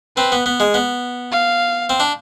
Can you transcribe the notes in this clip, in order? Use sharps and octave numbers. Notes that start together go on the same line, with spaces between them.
C4 B4
B3
B3
G#3
B3
F5
C4
D4